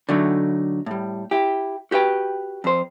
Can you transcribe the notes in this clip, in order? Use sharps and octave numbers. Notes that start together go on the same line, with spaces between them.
D3 F#3 A3 D#4
A2 G3
E4 G4
F#4 G4 B4 E5 G5
F2 C5